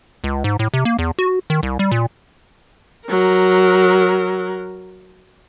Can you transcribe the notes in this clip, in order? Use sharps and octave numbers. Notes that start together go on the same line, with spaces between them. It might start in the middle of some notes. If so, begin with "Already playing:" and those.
C#2
G#2
A2
C3
A#3
E2
F#4
D#3
C2
G3
A#2
F#3 A#4